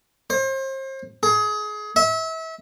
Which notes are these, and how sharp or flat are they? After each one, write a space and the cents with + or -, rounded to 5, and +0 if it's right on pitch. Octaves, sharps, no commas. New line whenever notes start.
C5 +35
G#4 +25
E5 -30